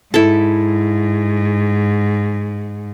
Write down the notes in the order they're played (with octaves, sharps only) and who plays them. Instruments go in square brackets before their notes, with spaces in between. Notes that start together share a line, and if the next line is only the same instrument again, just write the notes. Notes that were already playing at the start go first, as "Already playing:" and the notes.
[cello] G#2 [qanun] E4 A4